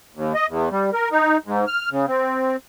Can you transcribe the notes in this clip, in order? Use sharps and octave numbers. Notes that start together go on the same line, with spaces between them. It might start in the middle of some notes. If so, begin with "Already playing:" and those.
D#2
D#5
E2
G3
A#4
D#4
G#2
F6
C#3
C4